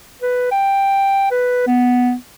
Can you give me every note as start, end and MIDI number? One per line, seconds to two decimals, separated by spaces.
0.22 0.47 71
0.51 1.30 79
1.31 1.62 71
1.67 2.14 59